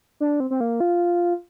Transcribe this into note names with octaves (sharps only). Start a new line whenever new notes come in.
D4
C4
C4
A#3
F4